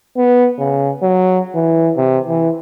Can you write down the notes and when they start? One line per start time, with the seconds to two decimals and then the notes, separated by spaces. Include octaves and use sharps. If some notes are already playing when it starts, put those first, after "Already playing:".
0.17 B3
0.59 C#3
1.02 F#3
1.55 E3
1.97 C3
2.26 E3